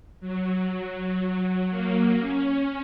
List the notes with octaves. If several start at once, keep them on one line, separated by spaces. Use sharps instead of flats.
F#3
F#3
A#3
C#4